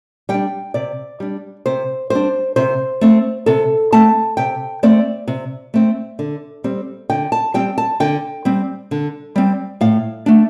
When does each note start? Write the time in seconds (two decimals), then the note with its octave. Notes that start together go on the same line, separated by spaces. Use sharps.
0.29 G3 D4 G5
0.74 C3 D5
1.20 G3 D4
1.66 C3 C5
2.10 G3 D4 C5
2.56 C3 C5
3.01 A3 C4
3.46 C3 A4
3.92 A3 C4 A5
4.37 C3 G5
4.83 A3 C4 D5
5.28 C3
5.74 A3 C4
6.19 D3
6.64 G3 C4
7.10 D3 G5
7.32 A5
7.54 G3 C4 G5
7.78 A5
8.00 D3 G5
8.45 G3 C4
8.91 D3
9.36 G3 C4
9.81 A2 F5
10.26 A3 D4